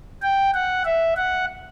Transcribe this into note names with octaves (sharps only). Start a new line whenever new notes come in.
G5
F#5
E5
F#5